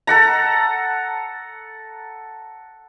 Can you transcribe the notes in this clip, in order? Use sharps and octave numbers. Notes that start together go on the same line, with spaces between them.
A4 F#5 A#5